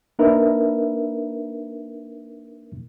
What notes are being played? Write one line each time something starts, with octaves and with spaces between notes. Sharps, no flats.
A#3 D4 D#4 A#4 B4 E5